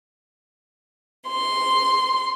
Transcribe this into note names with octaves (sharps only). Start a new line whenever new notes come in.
C6